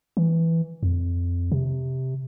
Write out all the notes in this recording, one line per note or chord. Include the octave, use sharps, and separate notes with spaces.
E3
F2
C3